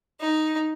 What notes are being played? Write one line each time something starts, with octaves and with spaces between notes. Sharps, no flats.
D#4